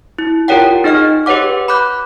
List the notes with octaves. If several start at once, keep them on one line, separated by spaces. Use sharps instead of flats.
E4
F4 G4 A#4 C#5 F#5 G5
D#4 G#4 D#5 F6
G4 B4 C#5 F#5 D6
B5 D6 F#6 G6